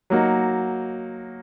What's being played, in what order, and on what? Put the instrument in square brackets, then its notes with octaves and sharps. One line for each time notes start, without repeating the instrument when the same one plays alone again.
[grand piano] F#3 A#3 D#4 F#4